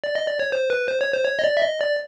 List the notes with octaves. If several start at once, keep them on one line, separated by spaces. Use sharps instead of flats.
D5
D#5
D5
C#5
C5
B4
C5
C#5
C5
C#5
D#5
D5
E5
D#5
D5